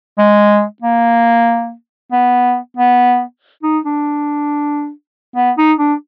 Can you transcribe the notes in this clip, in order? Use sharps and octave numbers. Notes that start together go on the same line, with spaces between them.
G#3
A#3
B3
B3
D#4
D4
B3
D#4
D4